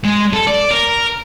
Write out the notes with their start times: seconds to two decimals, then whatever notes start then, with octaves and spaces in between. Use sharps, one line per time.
0.05 G#3
0.33 A4
0.47 D5
0.71 A#4